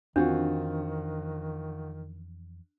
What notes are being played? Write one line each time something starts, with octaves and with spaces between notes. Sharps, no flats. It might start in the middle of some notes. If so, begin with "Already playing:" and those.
F2 D#3 E3 C4 D4 F4 F#4